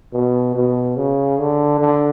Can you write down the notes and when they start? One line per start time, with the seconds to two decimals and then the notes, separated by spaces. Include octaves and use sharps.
0.12 B2
0.55 B2
0.96 C#3
1.38 D3
1.79 D3